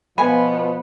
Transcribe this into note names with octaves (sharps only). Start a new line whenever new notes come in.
B2 F3 B3 G#5 B5